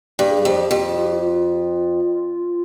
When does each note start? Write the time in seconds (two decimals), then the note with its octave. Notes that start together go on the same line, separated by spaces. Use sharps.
0.19 G2 G4
0.31 G#4
0.45 F2 G4
0.71 F2
0.97 F4
1.05 G4
1.12 F4